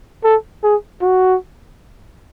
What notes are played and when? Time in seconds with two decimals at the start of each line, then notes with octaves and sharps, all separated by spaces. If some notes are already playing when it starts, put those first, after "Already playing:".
0.24 A4
0.64 G#4
1.02 F#4